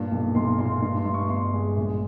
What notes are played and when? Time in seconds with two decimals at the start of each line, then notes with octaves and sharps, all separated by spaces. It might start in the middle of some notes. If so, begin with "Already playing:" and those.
Already playing: G2 A#2
0.12 B1
0.35 B1 C6
0.58 A#2 C6
0.82 G2 C6
0.98 C6
1.06 G2
1.14 C#6
1.29 G1 C6
1.53 G#3
1.77 A#1